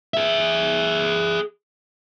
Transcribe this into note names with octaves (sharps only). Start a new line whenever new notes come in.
G#4 E5